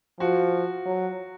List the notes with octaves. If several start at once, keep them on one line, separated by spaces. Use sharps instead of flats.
F3 F#4
F#3